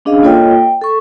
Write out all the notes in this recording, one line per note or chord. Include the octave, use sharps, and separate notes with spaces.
C#4 D4 G#4 D#5 F5
A#3 F4 A4 C#5 D#5 G5
G5
A4 C#6